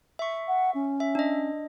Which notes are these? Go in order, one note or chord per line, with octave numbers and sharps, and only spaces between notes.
E5 C#6
F#5
C#4
E5
D4 D#5